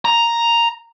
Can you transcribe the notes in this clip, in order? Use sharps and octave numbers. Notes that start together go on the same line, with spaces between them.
A#5